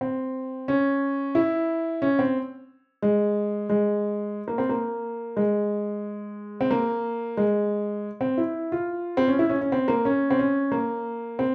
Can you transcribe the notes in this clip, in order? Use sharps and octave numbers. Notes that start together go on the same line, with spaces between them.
C4
C#4
E4
C#4
C4
G#3
G#3
A#3
C4
A#3
G#3
C4
A#3
G#3
C4
E4
F4
C4
C#4
E4
C#4
C#4
C4
A#3
C#4
C4
C#4
A#3
C4